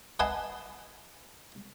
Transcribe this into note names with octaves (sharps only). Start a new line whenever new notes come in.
B4 D#5 F#5 G#5 A5 C6